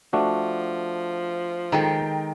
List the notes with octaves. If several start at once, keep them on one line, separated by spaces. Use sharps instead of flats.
F3 A3 D4 F#4
D#3 G#3 A4 G5 A#5